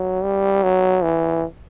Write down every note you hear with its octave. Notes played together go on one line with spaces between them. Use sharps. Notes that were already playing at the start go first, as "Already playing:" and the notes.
Already playing: F#3
G3
F#3
E3